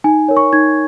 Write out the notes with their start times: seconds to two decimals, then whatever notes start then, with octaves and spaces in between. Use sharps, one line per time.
0.04 D#4 G#5
0.28 A#4 C#5
0.37 C#6
0.53 D#4 G#6